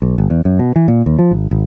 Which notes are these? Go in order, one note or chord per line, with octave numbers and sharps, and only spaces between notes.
B1
G1
E2
F#2
B2
E3
A#2
D#2
F3
G#1
G#1